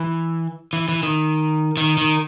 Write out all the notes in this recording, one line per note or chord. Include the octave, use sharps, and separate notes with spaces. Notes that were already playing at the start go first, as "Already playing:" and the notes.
Already playing: E3
E3
E3
D#3
D#3
D#3